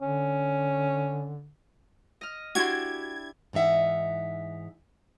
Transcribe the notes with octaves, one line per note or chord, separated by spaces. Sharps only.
D3 C#4
D#5 F6
D4 E4 F#4 G4 C6 G#6
G#2 E3 D#4 E5 F#5